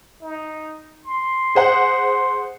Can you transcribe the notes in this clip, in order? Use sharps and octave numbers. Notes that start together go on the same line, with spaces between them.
D#4
C6
G#4 C5 F#5